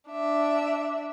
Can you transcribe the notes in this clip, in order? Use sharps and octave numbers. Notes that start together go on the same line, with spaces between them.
D4 E5